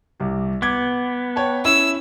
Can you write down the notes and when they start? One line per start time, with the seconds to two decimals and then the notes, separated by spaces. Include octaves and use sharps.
0.20 C2 G4
0.62 B3 D6 G#6
1.36 C#5 G5 A5
1.65 C#4 E4 C#5 E6